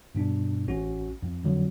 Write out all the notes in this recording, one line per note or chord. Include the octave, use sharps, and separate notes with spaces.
G2 B2 D4
A1 C#4 F#4
F2
F2 D3 F#3